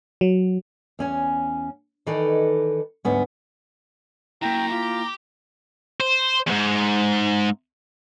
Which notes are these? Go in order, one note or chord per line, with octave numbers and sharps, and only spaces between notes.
F#3
E2 C#4 G#5
D#3 E3 D#4 A4 B4 D5
D2 G#2 B3 C#4
F#2 A#3 E4 G5 A#5
F4 G4
C5
E2 G#2